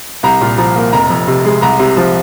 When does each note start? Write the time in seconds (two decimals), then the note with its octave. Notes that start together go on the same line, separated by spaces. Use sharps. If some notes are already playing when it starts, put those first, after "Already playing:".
0.23 C2 A#5
0.41 A#2
0.58 F3 A#5
0.76 A#3
0.93 F1 A#5
1.10 F2
1.28 C3
1.45 G#3
1.62 C2 A#5
1.79 C3
1.97 F3